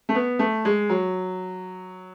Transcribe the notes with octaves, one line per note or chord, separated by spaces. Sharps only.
A3
B3
A3
G#3
F#3